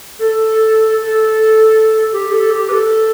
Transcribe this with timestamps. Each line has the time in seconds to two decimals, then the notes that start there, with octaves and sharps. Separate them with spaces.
0.19 A4
1.02 A4
2.13 G4
2.32 A4
2.51 G4
2.69 B4
2.73 A4